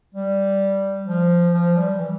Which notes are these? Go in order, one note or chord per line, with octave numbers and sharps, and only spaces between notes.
G3
F3
F3
G3
E3